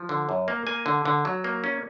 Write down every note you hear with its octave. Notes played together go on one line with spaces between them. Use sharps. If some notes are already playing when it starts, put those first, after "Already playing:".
Already playing: F3
D3
F#2
A#3
A#3 G#5
D3
D3
F#3
A#3
C#4